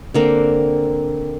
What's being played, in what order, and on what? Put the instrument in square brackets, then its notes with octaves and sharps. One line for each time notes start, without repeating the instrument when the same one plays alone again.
[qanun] D3 A#3 C4